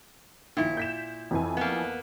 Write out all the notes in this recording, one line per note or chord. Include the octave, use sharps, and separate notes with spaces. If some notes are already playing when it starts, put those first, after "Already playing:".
A#1 A#2 D#3 E4
G6 B6 E7
F2 E3 G#5
A#3 B3